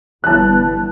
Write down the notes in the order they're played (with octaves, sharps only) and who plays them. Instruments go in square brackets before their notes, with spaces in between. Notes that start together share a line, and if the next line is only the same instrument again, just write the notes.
[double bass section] G1 E3 B3 [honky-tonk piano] A5 F#6